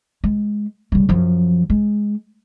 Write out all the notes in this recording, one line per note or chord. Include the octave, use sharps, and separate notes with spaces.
G#3
C#3 G3
F#2 F3
G#3